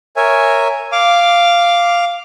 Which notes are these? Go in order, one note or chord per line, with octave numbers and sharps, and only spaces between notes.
A#4 C#5 E5 G#5
F5 D6